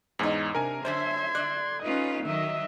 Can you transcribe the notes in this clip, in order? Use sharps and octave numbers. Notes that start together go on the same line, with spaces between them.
E2 G#2 C#4 D#4
C3 D4 A#4 G#5
F#2 D3 C#4 C5 E5 C6 G#6
D3 D5 F#6
C#4 D#4 F4 B4 D#5
D#3 F#3 D#5 E5